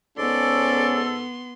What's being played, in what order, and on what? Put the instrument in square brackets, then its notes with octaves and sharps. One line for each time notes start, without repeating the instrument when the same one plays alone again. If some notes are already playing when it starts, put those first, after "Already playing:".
[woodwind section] G#2 A4 [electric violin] B3 C6 [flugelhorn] C#4 [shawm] D5